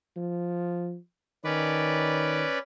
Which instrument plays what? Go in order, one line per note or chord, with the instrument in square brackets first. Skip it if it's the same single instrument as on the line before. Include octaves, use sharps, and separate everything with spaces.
[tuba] F3
[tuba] D#3 [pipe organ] C#4 B4 D5